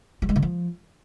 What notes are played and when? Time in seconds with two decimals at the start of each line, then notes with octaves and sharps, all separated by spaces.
0.22 F#3
0.29 G#3
0.36 D3
0.43 F3